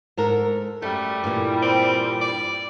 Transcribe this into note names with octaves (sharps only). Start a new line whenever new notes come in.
G#2 A4 A#4
F#2 G3 A3
G2 A#2 E3
C4
D5